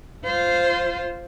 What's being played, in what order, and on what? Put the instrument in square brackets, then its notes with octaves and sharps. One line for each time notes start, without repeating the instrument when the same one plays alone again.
[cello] F4 C5